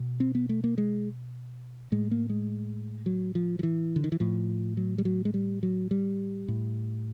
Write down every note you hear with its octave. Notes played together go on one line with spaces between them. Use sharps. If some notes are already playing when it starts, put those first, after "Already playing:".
Already playing: B2
C4
B3
A3
A#3
G#3
A2 G#3
A#3
G#3
F#3
F3
F3
E3
D3
D#3
E3
A2 F3
F#3
G3
F#3
G#3
G3
F#3
G3
A2